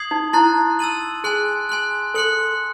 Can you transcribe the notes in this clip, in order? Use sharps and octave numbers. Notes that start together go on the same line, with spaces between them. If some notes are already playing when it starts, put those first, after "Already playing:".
Already playing: D#6 G#6 C7 F#7
D#4
E4 A5 C6 F#6 A6
E6 A6 D#7 F#7
G#4 G#5 C6 F#6
G#5 C6 F#6
A4 C6 F#6 C#7 F#7